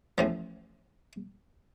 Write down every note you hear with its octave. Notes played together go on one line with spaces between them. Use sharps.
A1 A2 F3